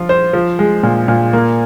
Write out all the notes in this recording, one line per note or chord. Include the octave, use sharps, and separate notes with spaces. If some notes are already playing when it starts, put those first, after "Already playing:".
Already playing: F3 F4
C5
F3
G#3
A#2
A#2
A#3